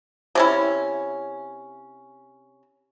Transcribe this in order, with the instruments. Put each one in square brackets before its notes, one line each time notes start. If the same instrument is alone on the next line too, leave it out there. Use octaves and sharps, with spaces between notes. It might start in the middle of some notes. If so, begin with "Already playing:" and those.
[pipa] C3 C#4 E4